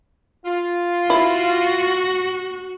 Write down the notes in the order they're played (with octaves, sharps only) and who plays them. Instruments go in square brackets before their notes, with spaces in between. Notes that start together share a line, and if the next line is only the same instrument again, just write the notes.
[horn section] F4
[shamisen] E4 [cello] F#4